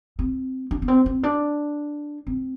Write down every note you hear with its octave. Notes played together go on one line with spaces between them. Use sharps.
C4
D4
B3
C4
C4
D4
C4